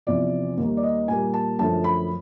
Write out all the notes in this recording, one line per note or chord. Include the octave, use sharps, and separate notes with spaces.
E2 C3 F3 D5
D#2 D#3 G3 A#3
D5
D#5
A#2 G3 A#3 G#5
A5
F#2 D3 F3 A3 A5
B5